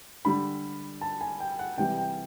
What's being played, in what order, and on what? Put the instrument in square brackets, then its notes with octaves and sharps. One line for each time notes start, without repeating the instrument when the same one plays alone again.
[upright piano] D3 G3 B5
A5
G#5
G5
F#5
C3 E3 G3 G5
G5